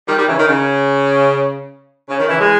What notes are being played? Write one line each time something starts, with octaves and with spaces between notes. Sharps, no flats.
D#3 G3
D#3 G3
C#3 E3
D#3
C#3
C#3
D#3
C#3 E3
E3 G#3